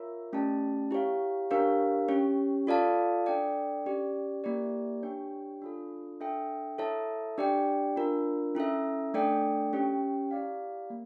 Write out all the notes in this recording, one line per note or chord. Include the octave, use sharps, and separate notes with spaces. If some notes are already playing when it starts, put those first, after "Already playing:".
Already playing: F4 A#4 C#5 E5
A3 C#4 G4 D5 A5
E4 G4 C#5 F5
D4 G4 A#4 C#5 F5
C#4 G4 C#5
F4 A4 D5 F5 A5
D4 A4 D5 G5
C#4 G4 D5
A#3 E4 G4 D5
D4 G4 C#5 G5
D4 F4 A4
D4 A4 E5 G5
E4 A4 C#5 E5 A5
D4 G4 D5 G5
D4 F4 A#4
C#4 E4 A4 E5
A3 D4 A4 D5 G5
C#4 G4 C#5 G5
E4 G4 D5 F5
A#3